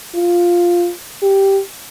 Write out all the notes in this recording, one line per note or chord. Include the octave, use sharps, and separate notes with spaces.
F4
G4